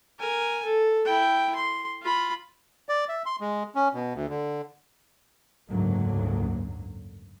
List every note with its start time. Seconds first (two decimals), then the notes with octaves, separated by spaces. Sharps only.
0.19 A#4 G#5
0.64 A4
1.05 E4 G5
1.55 C6
2.02 F4 B5
2.89 D5
3.09 E5
3.26 C6
3.41 G#3
3.75 C#4
3.94 B2
4.14 D2
4.30 D3
5.69 F#1 D2 G#2 F#3 A#3